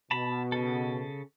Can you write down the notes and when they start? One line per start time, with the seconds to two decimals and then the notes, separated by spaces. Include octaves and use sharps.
0.11 B2 A5 B5
0.52 C#3 A4